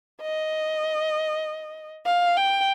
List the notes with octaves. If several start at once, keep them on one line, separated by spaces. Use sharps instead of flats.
D#5
F5
G5